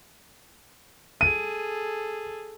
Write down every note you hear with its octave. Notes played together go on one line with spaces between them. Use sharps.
G#4 A4 D#7